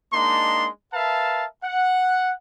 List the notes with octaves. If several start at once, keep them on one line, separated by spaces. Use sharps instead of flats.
G#3 A#3 D4 D#4 A5 C6
A#4 B4 E5 F5 A5
F#5